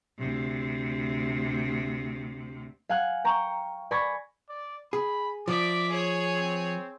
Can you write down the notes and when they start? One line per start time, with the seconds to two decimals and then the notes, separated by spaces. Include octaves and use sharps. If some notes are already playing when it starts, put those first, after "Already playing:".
0.18 D2 C3
2.89 F5 F#5 G#5 F#6
3.25 G5 A#5 C#6
3.91 D5 G#5 B5 C#6 G#6 A#6
4.50 D5
4.93 G#4 B5
5.48 F3 D5 E5 D6
5.89 G#4 C#5
6.36 C4